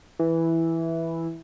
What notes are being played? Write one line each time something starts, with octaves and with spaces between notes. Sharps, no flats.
E3